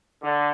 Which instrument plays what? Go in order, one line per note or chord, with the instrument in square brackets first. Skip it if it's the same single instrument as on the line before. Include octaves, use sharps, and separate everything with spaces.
[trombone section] D3